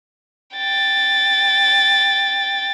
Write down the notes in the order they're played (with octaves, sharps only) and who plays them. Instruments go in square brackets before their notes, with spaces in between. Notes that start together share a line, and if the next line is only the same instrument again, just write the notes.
[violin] G5 A6